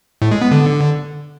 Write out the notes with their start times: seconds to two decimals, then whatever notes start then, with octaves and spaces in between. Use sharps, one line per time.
0.22 A2
0.32 G#3
0.41 B3
0.51 D3